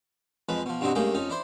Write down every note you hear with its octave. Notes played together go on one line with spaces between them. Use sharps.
F2 F3 G#3 B4
B2 F3
G2 B2 D3 C4 D#4 F#4
C#2 G2 A3 A#3 G#4 G5
F2 C#4 D#4
D4 E4 C5